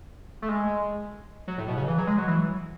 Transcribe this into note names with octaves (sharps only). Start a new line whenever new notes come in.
A3
G#3
F#3
A2
B2
C#3
E3
F#3
G#3
F#3
E3